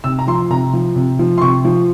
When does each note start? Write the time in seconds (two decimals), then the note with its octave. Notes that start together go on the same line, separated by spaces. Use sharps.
0.04 C3 E6
0.19 A#5
0.27 F3 C6
0.50 C3 A#5
0.73 F3
0.96 C3
1.19 F3
1.38 C6
1.41 C3 C#6
1.65 F3